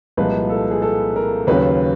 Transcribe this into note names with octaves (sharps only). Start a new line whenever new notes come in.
C2 A#2 F3 G#3 B4
A4
G#4
A4
A#4
D#2 C#3 F#3 B4